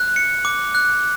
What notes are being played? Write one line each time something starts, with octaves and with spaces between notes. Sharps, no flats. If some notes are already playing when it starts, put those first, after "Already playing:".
Already playing: F#6
C#7
D6
F#6